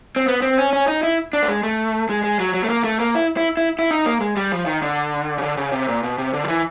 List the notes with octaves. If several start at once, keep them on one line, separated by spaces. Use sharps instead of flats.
C4
B3
C4
C#4
C#4
D#4
E4
D4
A3
G#3
A3
G#3
G#3
F#3
F#3
A3
A#3
A3
A#3
E4
E4
E4
E4
D#4
A#3
G#3
G3
F3
D#3
D3
C#3
D3
C#3
C3
A#2
B2
C3
D3
F3
E3